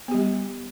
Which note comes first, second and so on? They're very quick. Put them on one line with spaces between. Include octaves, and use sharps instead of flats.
B3 G4 G3